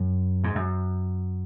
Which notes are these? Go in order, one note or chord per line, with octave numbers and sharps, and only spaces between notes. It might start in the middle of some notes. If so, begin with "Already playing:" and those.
Already playing: F#2
G#2
F#2